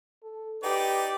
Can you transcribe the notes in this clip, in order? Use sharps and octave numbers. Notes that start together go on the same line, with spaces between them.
A4
D#4 G4 B4 D5